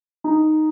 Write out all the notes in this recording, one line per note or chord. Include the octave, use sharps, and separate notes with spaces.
D#4